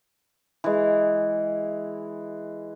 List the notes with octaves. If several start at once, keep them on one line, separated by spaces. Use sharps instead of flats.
E3 G#3